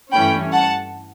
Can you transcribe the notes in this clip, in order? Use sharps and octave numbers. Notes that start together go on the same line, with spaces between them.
G2 E3 A3 C#4 G5 B5
F#5 A5